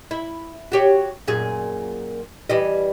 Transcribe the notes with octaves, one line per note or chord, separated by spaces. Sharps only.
E4
F#4 G4 C#5
F#2 A#2 G#4
E3 G3 D#5